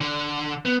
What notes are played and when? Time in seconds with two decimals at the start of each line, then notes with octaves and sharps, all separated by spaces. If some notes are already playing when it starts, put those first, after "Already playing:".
0.01 D3
0.65 B3